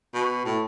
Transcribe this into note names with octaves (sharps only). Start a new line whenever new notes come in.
B2
A2